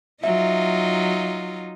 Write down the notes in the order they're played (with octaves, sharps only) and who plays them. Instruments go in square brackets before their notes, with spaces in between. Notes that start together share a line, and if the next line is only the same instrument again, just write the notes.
[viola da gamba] F#3 D#4 F4 [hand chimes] E5